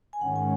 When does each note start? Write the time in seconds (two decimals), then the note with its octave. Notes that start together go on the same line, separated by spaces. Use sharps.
0.13 G#5
0.21 G#2 D#3 G#3 C#4 F#5
0.36 G#5